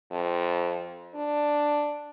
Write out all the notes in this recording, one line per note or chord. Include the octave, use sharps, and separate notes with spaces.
F2
D4